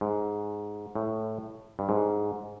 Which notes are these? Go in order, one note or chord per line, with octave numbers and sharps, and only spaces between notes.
G#2
A2
G2
G#2